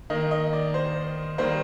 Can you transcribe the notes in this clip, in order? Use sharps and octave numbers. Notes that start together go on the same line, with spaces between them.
D#3 A#3 D#5
D#5
D5
C5
D#3 G3 A#3 C5